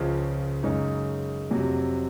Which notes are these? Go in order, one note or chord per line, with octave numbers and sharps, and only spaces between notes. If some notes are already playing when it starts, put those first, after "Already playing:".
Already playing: C#2 C#3 F3
F#2 C#3 G#3 D#4
F2 C3 F#3 C4